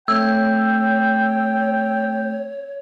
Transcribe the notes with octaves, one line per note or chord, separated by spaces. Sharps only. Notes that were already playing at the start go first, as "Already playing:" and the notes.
A3 C4 C#5 G5 E6